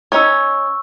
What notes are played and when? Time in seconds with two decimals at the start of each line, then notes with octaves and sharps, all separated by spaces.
0.12 C#4 D#4 C#5 C#6 E6